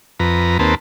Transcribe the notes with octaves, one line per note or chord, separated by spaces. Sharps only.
F2 B4 A#5
D#2 A#3 C4 B4 A5